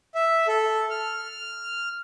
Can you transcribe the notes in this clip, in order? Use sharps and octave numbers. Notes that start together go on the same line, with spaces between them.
E5
A4
F6